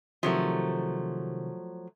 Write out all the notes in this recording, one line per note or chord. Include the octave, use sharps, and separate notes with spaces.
C3 D#3 F3 F#3 A3